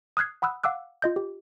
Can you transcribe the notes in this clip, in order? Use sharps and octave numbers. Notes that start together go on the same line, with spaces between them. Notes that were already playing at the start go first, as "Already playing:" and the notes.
D#6 F6 F#6 G#6 C7
F#5 B5 D#6 E6 F#6
F5 F#5 D6 E6 F#6
F4 D#5 G6
G4